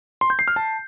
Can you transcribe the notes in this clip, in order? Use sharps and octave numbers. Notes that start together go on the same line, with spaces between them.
C6
G6
C7
F6
A5